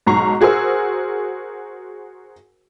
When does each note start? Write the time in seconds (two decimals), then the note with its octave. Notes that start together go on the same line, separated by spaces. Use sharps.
0.06 B1 G#2 A#5 C#6 C7
0.41 F#4 G#4 A#4 C5 E6